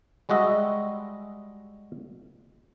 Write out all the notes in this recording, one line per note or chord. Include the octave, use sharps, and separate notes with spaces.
G3 G#3 F#4 D#5 E5